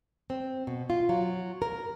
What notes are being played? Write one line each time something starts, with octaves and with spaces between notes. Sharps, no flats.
C4
B2
F4
F#3
A#4